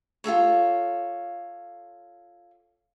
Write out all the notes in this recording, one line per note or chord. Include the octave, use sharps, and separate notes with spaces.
F4 G#4 A4 C#5